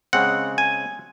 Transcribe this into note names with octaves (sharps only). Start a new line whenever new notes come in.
C#3 G#3 C4 F#5
G#5